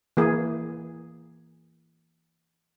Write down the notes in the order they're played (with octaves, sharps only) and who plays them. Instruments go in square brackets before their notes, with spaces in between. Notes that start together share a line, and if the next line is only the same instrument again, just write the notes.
[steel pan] E3 A#3 G#4